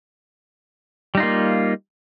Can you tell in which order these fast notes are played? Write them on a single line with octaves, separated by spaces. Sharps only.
G3 D#4 F4 A#3